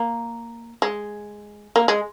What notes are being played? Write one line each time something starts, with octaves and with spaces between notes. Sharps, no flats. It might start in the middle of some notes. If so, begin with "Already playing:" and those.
Already playing: A#3
G#3
A#3
G#3